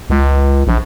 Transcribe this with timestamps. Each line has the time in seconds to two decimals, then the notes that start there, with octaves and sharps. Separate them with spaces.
0.10 C#2
0.67 A#1